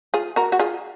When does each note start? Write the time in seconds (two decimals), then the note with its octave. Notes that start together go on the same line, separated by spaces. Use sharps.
0.14 F4 G#4
0.36 F#4 A#4
0.52 F#4
0.59 F4 G#4